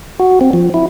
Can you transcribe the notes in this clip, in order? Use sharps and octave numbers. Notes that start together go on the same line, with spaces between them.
F#4
C4
F3
E4